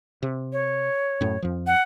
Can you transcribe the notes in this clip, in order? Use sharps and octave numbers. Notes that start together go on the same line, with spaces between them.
C3
C#5
F#2 A2
F2 F3
F#5